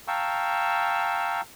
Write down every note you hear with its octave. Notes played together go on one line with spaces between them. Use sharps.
F5 G5 A5 A#5 C#6 E6